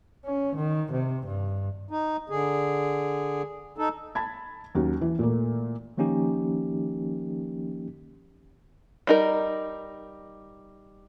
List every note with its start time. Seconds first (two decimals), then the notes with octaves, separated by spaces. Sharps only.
0.25 C#4
0.55 D#3
0.92 C3
1.26 G2
1.91 D#4
2.30 D3 G#4
3.78 D#4 A4
4.15 A5 B5 G#6
4.75 D#2 F#3 C#4
5.01 E3
5.19 A#2 A3 A#3
5.97 D#3 F3 A#3 C#4 D#4 G4
9.07 G3 D#4 A#4